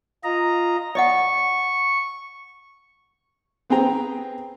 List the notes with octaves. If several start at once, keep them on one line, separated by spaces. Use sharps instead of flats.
F4 D#5 A#5
D5 D#5 F#5 C#6
B3 C4 G#4 G5 A#5